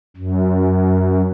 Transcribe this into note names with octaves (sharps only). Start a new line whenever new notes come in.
F#2